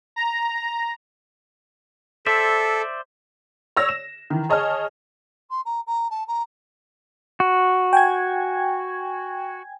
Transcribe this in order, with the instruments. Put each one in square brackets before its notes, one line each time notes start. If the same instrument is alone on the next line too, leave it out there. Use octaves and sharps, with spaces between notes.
[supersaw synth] A#5
[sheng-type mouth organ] A4 [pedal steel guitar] C5 D5 E5 [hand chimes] B6
[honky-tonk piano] C#5 D5 E6 A#6
E7
D#3 E3
G#4 C#5 D#5 G#5 A5 F6
[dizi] C6
A#5
A#5
A5
A#5
[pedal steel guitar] F#4
[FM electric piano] G5 G#5 G#6